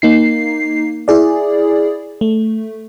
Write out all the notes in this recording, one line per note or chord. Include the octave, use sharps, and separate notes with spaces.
A#3 D#4 C7
E4 G#4 D5
A3